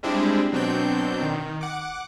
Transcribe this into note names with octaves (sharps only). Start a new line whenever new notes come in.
G3 G#3 C4 D4 E4
B2 F#3 C4 D4 G6
D#3
F#5 D6